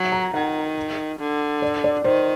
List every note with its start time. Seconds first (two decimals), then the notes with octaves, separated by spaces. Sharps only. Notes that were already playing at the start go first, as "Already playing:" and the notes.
Already playing: F#3
0.12 A#5
0.34 D#3 F#5
1.20 D3
1.62 D5
1.84 D5
2.04 D#3 C5